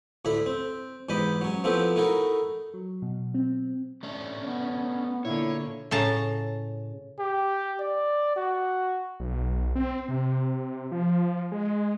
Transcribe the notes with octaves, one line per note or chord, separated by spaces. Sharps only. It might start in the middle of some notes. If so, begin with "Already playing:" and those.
D2 A2 E4 E5 B5
C4
E2 G#2 G4 D#5 B5
F#3 C#4
F3 A3 B3 C4 E4 G4
A3 D#4 E4 F#4 A#4
F#3
B2
C4
A3 C#4 D4
B3
A#2 D3 E4 C#5
A2 C#3 A5 A#5
G4
D5
F#4
B1
C4
C3
F3
G#3